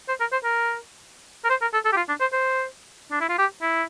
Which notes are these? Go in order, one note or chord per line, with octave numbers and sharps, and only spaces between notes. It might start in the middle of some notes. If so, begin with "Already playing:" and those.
C5
A#4
C5
A#4
A#4
C5
A#4
A4
A4
G4
F4
D4
C5
C5
D4
E4
F4
G4
E4